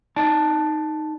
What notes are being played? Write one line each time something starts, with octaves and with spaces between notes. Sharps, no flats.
D#4 D5 A5